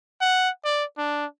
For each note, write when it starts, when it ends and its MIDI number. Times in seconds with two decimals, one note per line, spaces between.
0.21 0.49 78
0.64 0.84 74
0.98 1.26 62